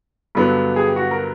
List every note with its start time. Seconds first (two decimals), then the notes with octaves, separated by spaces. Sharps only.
0.35 G2 D3 F#3 B3
0.76 G#4
0.86 G4
0.96 F#4
1.11 A#4